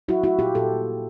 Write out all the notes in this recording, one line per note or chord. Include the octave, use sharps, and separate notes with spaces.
F#3 E4 F#4
A3 E4 F#4
A#2 F4 G4
A#2 G4 A4